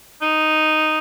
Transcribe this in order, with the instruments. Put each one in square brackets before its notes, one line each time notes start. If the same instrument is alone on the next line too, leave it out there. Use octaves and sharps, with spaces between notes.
[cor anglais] D#4